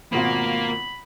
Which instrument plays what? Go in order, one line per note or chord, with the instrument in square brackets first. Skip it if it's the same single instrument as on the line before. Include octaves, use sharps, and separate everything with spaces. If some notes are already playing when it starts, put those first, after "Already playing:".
[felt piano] G#1 B2 F4 [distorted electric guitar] A#3 [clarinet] B5